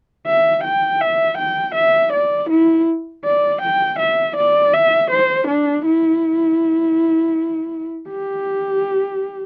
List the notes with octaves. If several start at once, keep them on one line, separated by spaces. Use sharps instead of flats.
E5
G5
E5
G5
E5
D5
E4
D5
G5
E5
D5
E5
C5
D4
E4
G4